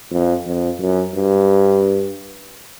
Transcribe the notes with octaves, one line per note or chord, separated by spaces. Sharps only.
F2
F2
F#2
G2